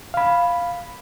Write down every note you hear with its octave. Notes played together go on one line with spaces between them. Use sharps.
F5 B5